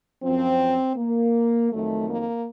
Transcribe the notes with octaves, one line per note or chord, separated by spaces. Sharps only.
F#2 F3 C4
A#3
F2 D#3 F#3 A3
A#3